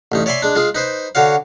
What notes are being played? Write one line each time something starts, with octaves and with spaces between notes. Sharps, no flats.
A1 G2 D#4
C#5 D5 E5 G#5 B5 C6
G#3 D4
G#3 F4 G#4
D#4 B4 C5
D3 F#4 C#5 F5